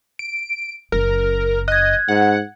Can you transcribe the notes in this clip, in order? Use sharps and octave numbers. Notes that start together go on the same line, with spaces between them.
D7
F#1 F#2 A#4
D#5 F#6 G#6
G#2 F#5